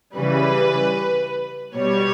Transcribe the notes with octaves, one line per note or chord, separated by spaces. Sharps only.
C#3 E3 G3 B4
B2 G3 C#5